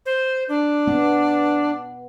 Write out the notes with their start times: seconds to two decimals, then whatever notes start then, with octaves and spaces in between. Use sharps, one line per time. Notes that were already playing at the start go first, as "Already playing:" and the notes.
0.06 C5
0.49 D4
0.87 B3